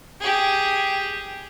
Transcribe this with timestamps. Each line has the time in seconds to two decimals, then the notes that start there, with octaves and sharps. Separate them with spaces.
0.20 G4 G#4